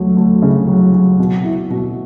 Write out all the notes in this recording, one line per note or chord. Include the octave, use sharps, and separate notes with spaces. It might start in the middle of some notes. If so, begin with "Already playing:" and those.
Already playing: D2 F#3
D2
C#3
F#3
F#3
B2
E4
B2